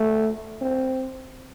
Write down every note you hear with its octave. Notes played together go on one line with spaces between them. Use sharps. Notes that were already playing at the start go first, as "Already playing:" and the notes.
Already playing: A3
C4